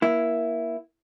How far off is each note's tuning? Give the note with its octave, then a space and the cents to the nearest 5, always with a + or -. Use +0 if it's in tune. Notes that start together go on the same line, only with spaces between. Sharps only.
A#3 +30 E4 +0